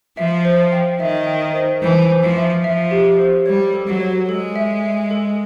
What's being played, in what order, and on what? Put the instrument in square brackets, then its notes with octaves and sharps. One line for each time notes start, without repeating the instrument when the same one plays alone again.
[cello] F3 [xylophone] E5
[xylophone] C5
G5
[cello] D#3 [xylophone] E5
[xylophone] G5
C5
[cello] E3 [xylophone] C5
[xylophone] C5
[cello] F3
[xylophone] E5
[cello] F3 [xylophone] E5
[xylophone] G4
C5
[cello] G3 [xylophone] C#5
[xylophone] A4
[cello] F#3
[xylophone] C#5
[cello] G#3 [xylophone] A4
[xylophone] E5
E5
A4